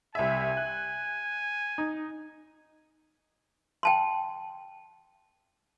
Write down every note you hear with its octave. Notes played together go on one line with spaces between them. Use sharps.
C2 E5 G#5
F#6
D#4
G5 A5 C6